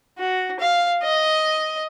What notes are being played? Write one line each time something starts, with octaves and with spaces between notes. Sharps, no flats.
F#4
F5
D#5